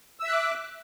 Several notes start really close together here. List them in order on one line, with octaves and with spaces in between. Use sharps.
E6 E5 F#6 D6